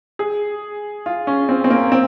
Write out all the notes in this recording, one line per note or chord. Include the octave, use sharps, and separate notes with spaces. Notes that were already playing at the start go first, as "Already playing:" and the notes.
G#4
F4
C#4
C4
C4
A#3
C4